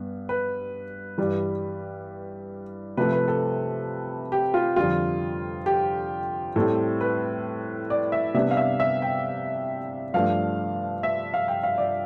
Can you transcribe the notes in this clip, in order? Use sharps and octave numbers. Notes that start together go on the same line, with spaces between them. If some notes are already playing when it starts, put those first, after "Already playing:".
Already playing: G2 B3
B4
G2 E3 G3
C3 F3 A3 B4
B4
A4
G4
F4
F2 D3 G3 F4
G4
A2 G3 C4 A4
B4
D5
E5
C3 G3 B3 D4 E5
F5
E5
E5
G5
G2 F3 A3 D4 F5
E5
F5
G5
F5
D5